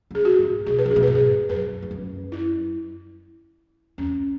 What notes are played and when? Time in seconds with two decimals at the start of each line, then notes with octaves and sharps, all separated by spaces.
0.11 C#3
0.15 G#4
0.25 F#4
0.39 G#2
0.66 B2 G#4
0.79 B4
0.86 C#3
0.91 G#4
0.96 B2
1.03 G#2 B4
1.15 G#4
1.49 F#2 B4
1.82 E2
1.91 F#2
2.32 E4
3.98 E2 C#4